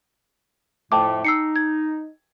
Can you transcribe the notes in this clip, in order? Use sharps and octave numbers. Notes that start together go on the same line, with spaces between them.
F2 A2 A3 G5 A5 D6
D#4 E6 C7 C#7
G#6